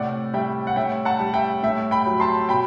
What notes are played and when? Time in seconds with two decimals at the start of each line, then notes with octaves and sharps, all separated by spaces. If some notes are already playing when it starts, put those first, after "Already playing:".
Already playing: A2 C3 D5 F#5
0.34 G3 E5 G5
0.67 F#5
0.76 A2 E5 G5
1.05 F#5 A5
1.20 G3
1.34 E5 G5
1.63 A2 E5
1.91 G5 B5
2.06 F#3
2.20 A5 C6
2.49 B2 G5 B5